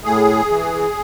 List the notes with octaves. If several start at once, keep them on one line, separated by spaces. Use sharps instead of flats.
A2 G#4
E3